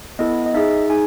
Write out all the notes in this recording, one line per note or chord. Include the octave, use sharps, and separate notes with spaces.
B3 E4 A4 D#5
D#5
D#4 G#4 E5
D#4 G#4 G#5